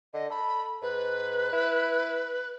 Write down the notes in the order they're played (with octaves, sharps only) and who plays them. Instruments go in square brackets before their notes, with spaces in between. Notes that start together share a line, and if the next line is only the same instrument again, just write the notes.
[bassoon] D3 [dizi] D#5
[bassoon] A4 [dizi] B5
[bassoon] G#2 [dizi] B4
[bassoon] E4